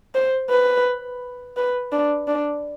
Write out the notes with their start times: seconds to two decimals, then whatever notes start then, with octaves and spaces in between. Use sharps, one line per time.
0.15 C5
0.50 B4
1.57 B4
1.92 D4
2.28 D4